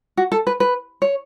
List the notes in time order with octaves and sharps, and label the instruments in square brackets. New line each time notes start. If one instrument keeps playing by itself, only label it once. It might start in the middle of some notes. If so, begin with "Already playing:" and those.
[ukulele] F#4
A4
B4
B4
C#5